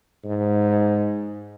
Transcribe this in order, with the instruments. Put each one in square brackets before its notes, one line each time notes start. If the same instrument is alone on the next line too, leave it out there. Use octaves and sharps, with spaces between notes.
[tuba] G#2